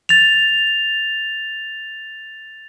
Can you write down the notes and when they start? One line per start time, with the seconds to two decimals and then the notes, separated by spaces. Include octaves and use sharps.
0.09 A6 F7